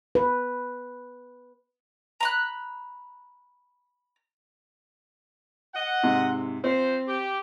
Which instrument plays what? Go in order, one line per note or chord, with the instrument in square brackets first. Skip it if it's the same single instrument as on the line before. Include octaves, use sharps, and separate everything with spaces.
[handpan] B4
[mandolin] A#5 B5 F#6
[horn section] D#5 F#5
[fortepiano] G#2 C3
[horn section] F3 C5 [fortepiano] C4
[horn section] G4